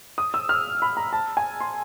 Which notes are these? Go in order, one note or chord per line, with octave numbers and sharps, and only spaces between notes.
D#6
E6
F6
B5
A#5
A5
G#5
C6